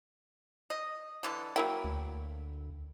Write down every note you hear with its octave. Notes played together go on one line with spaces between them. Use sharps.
D#5
D3 E3 A4
F#3 A#3 E4 G5
D2